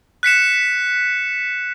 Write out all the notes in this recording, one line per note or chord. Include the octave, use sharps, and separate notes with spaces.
F#6 B6 C#7 E7